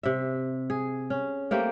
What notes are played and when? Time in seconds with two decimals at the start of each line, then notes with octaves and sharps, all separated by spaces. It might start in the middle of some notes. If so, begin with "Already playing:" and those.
0.03 C3 E5
0.70 G#4
1.10 C#4
1.51 A3 A#3 C4 G4